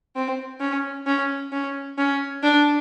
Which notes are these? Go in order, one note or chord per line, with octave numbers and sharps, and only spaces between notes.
C4
C#4
C#4
C#4
C#4
D4